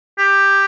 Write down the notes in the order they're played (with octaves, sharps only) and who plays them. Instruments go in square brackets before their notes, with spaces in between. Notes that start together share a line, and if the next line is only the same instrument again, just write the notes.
[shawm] G4